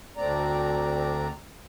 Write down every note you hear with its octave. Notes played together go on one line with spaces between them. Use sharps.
D2 A3 C4 D4 D5 A#5